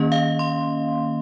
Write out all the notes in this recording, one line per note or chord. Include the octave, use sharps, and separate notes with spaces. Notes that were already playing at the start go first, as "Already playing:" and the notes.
Already playing: D#3 A#3 C#4 D#5
F5
C6